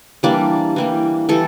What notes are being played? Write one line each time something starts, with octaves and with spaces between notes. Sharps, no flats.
E3 G3 A#3 D4
E3 G3 A#3
E3 G3 A4